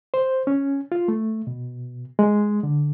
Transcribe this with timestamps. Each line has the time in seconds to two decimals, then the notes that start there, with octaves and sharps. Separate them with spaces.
0.14 C5
0.47 C#4
0.92 F4
1.08 A3
1.47 B2
2.19 G#3
2.63 D3